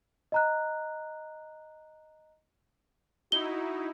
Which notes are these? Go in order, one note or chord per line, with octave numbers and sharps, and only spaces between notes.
D#5 A#5 F#6
D#4 E4 F#4 G7